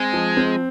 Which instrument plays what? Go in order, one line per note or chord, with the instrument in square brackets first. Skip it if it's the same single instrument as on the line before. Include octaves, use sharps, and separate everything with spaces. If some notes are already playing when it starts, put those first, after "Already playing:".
Already playing: [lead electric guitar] G#3 [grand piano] C4
[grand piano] F3
C4